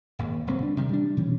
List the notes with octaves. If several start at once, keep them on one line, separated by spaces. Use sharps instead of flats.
G#1 D#2
D1 C2 C#3 C4
D4
C3 D#3 G3
G3 D4
B2 E3 G3 C#4